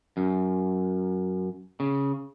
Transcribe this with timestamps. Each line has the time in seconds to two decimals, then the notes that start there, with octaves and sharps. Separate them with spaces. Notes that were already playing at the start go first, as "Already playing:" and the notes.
0.17 F#2
1.80 C#3